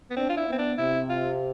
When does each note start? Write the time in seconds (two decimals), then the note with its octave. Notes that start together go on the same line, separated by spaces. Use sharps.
0.10 B3
0.17 C4 D4
0.29 F4
0.37 E4
0.47 B3 C4
0.58 D4
0.78 C3 E4
1.09 F4